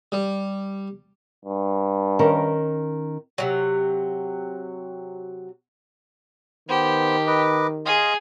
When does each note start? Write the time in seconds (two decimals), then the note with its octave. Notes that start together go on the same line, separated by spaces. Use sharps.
0.12 G3
1.45 G2
2.19 D#3 C#4 A#4
3.38 C3 F#3
6.69 D#3 B3 G4 C5
7.27 B4 D#5 D6
7.86 G#4 D#5 F5 C6